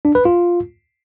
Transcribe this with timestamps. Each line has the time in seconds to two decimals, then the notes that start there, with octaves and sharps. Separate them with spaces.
0.05 D4
0.15 B4
0.25 F4